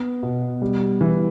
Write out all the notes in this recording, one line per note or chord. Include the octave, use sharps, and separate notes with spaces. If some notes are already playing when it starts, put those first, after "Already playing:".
Already playing: B3
B2
G3
E3